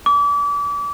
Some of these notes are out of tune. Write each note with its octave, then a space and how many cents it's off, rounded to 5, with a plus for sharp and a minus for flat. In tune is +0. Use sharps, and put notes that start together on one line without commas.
D6 -35